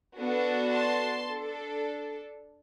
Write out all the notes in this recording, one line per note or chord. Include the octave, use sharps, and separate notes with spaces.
B3 D4 F#4 A4
A5 C6
D4 A4